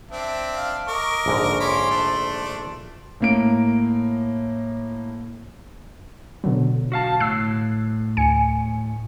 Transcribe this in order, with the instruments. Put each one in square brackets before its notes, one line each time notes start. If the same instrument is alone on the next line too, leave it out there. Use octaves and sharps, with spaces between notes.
[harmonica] C4 D4 [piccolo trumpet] E5
[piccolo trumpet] F5
[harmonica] A#4 C#6 D6 [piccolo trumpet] D#5
[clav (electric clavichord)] A#1 G#2 D3
[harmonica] C#4 B5 D6 [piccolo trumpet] C6
[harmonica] A3 D4
[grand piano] A2 A#3 D7
[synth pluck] B2 D3 F#3
[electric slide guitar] F#4 F5 A5
[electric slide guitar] A2 [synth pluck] E6 F#6 C7
[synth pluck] D2 G#5 C#7